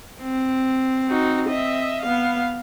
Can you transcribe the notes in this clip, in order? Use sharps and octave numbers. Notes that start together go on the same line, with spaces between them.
C4
D#4 F#4
D#5 E5
B3 F5